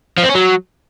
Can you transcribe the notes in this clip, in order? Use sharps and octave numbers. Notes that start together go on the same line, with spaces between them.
F3
C4
C#4
F#3